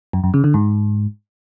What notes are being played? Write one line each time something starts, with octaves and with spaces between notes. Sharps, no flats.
F#2
F#2
C#3
D3
G#2